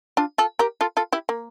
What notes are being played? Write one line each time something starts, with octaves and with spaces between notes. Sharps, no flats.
D4 F4
F4 A4
G4 A#4
F4 A4
F4 A4
E4 G4
A#3